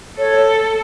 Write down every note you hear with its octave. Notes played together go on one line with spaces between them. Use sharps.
A4 C#5